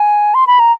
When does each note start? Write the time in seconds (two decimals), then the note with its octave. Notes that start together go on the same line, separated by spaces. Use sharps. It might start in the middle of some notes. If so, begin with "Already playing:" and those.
Already playing: G#5
0.34 C6
0.47 B5
0.60 A#5